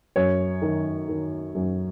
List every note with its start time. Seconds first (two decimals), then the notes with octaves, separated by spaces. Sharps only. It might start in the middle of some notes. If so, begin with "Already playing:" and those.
0.16 F#2 C#5
0.62 D#3
1.08 D#3
1.55 F#2